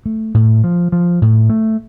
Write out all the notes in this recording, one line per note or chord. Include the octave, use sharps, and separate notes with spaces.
A3
A2
F3
F3
A2
A3